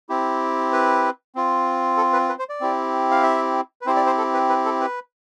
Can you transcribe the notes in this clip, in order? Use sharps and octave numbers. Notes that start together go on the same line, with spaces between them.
C4 E4 G4
B4
C4 F4
A4
B4
B4
C5
D5
C4 E4 G4
F5
E5
B4
C4 E4 G4 C5
D5
C5
A4
B4
B4
A4
B4